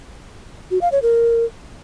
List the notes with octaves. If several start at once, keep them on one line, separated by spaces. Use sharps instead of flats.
F#4
F5
C#5
A#4